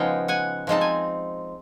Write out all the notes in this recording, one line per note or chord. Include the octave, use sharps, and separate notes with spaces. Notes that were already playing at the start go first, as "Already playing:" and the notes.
Already playing: C#3 F3 G#3 B3 D#4 F5 G5
F#5 G#5
F3 G#3 C4 D#4 A5
G#5